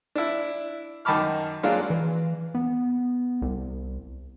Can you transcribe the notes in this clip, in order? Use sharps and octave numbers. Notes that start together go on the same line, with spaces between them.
D4 E4
F#2 D#3 A5 B5 D6 F6
F#3 G#3 A#3 D4 F4
E3
B3
C2